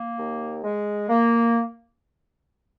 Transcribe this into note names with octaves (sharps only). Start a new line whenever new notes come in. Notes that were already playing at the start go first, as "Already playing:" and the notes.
Already playing: A#3
D#2
G#3
A#3